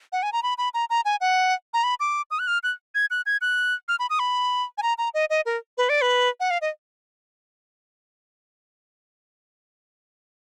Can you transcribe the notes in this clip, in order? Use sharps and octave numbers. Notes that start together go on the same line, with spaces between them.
F#5
G#5
A#5
B5
B5
A#5
A#5
G#5
F#5
A#5
B5
D6
D#6
F#6
F6
F#6
G#6
F#6
G#6
F#6
F6
B5
D#6
B5
G#5
A#5
A#5
D#5
D#5
A#4
B4
D5
B4
F#5
F5
D#5